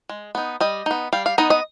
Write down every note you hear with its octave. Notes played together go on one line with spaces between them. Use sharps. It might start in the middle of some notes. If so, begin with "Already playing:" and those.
G#3
B3 D#4
G3 D#5
B3 D#4
G3 F5
F5
B3 D#4 D#5
D#5